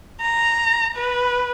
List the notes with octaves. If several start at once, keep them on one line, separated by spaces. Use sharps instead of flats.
A#5
B4